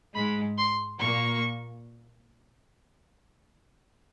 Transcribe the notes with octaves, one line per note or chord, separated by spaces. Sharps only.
G#2 G#3 B5
C6
A#2 A#3 C#6